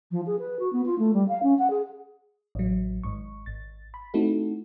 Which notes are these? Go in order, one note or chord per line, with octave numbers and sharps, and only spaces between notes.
F3
G#4
B4
F#4
B3
F4
A3
G3
F5
C#4
F#5
G#4
A1 F#3
G#1 G#2 C#6
G#1 A6
B5
A3 C4 D#4 E4 F#4 A4